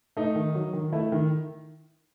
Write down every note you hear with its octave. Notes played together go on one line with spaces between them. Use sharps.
A3 D#4
D#3
F#3
D#3
A3 E4
D#3